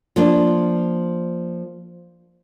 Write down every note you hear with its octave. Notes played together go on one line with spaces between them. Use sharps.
F3 A#3 D4